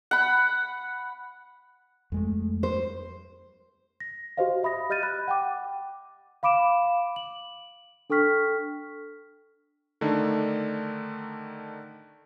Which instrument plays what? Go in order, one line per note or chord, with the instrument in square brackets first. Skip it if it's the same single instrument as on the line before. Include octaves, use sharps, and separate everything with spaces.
[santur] F#5 B5
[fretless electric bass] F2 G#3 A3
[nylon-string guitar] C5
[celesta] A#6
F#4 G4 C5 D#5 F5
E5 B5 D#6 A#6
G4 D#5 F6 G6 A6 D#7
B5 F#6
F#5 G5 D6
F5 B5 D6 D7 E7
F#7
D4 A4 G5 C#6 F6 B6
[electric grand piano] D3 D#3 A3 D4 D#4